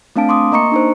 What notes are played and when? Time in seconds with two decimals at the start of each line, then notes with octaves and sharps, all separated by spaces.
0.16 A3 C4 D4 F5 A5 D7
0.29 C6 D6 D#6
0.52 A#3 D#5 A#5 C#6 C#7
0.72 D4 D#4 C5